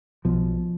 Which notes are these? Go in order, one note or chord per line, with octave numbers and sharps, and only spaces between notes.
B1 B2 F3